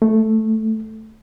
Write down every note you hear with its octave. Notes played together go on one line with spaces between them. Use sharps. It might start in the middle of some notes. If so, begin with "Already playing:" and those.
A3